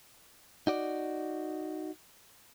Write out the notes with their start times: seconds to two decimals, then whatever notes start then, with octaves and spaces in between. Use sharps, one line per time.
0.67 D#4 F#4 D5